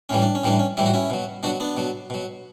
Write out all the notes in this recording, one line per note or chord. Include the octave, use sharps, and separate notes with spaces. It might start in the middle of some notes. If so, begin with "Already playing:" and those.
A2 E3 G3 C#4
D4
C#4
A2 E3 G3 D4
C#4
A2 E3 G3 E4
F#4
C#4 E4
B2 F#3
B2 F#3 D4 F#4
B3 D4
B2 F#3
B2 F#3